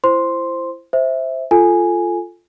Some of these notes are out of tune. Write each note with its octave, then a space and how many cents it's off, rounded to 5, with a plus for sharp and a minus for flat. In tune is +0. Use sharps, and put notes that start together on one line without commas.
E4 +30 C5 +0 C6 +0
C5 +0 E5 -5
F4 -5 A4 +0 G#5 +0